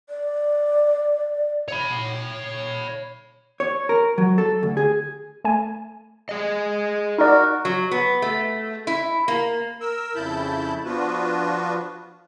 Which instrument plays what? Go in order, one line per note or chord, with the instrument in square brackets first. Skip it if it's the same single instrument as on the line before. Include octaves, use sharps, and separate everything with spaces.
[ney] D5
[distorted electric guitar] C#5 B5
[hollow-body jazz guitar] C#5
A#4
F#3
A4
D2
G#4
[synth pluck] A3 G#5
[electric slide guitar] G#4 D#5
[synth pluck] D#4 D5 [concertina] F#4 A#4
[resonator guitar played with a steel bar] F#3
B3
A3
E4
A#3
[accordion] A#4 E6
F2 C#3 E4 A5 B5 G6
F3 B3 D4 F4 F#4 B4